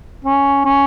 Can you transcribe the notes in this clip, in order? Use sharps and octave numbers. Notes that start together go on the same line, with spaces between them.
C#4
C#4